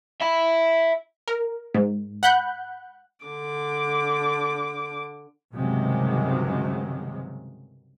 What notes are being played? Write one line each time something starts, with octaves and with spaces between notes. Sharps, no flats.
E5 B5
A#4
G#2
F#5 B5 F#6 G6
D3 D6
C#2 G2 C3 D#3 F#3 G#3